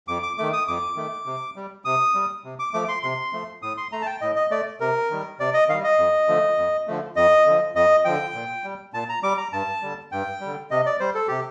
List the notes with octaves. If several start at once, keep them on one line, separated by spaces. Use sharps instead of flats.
F2 D6
D6
D#3 A3 D6
D#6
F2 D6
D#3 A3
C3
G3
C3 D#6
G3
C3
D6
F3 A3 D6
C6
C3 C6
F3 A3
A2 D#6
C6
A3 A#5
A5
G5
A2 D#5
D#5
A3 D5
C3 A#4
D#3 G3
C3 D5
D#5
D#3 G3 F5
D#5
F2
D3 F3 A3
F2
D3 F3 A3
F2 D#5
D3 F3
F2 D#5
D3 F3 G5
A#2
G3
A#2 A5
A#5
G3 D6
A#5
G2 A5
D3 G3
G2 G5
D3 G3
C3 D#5
D5
G3 C5
A4
C3 G4